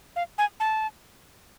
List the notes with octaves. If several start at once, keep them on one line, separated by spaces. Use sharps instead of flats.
F5
G#5
A5